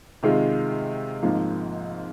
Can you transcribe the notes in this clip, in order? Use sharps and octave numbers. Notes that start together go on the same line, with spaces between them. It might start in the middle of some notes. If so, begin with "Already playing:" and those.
C3 D#3 G#3 F4
G#1 G#2 F3 A#3